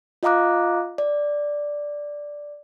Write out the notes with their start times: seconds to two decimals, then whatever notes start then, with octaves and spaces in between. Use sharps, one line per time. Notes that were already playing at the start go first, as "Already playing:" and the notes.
0.23 F4 D#5 F5 A#5 D6 F#6
0.98 D5